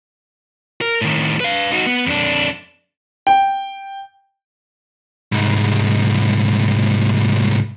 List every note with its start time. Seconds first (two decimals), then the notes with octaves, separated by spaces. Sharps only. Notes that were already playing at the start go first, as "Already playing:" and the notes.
0.81 A#4
1.01 A2 D#3
1.40 B4 F5
1.72 D#4 F#4
1.86 B3
2.07 F2 D4
3.27 G5
5.32 C2 G#2